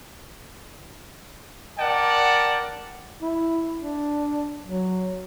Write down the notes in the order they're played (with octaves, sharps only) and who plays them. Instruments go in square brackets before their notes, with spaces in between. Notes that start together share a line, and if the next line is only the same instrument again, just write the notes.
[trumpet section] A#4 D5 F#5 G5 A5
[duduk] E4
D4
F#3